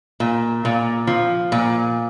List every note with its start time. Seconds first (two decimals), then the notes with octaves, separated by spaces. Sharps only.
0.20 A#2
0.65 A#2
1.07 F3
1.52 A#2